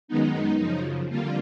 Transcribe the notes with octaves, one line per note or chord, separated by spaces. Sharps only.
F#2 D#3 G#3 B3 D#4
F#2 C#3 F3
F2 D3 G3 A#3 F4